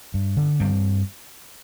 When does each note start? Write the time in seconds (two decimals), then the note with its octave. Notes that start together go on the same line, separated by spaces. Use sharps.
0.14 G2
0.37 D3
0.60 G2 G3 C4